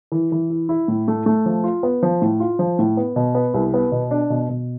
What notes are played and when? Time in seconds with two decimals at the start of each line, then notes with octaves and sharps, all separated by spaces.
0.12 E3
0.32 E3
0.50 E4
0.69 E4
0.88 A2
1.08 A3
1.26 A3
1.46 F3
1.64 F4
1.83 B3
2.03 F3
2.22 A2
2.40 F4
2.59 F3
2.79 A2
2.97 B3
3.16 B2
3.35 B3
3.54 C2
3.74 B3
3.92 B2
4.11 D4
4.30 B2
4.49 B2